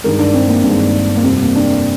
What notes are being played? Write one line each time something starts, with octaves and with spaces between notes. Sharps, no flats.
G2 D#3 G#3 A#4
D4
C4
A#3
G2 D#3 G#3
A#3
F2 C3 G3 C4
A#3
D4
C4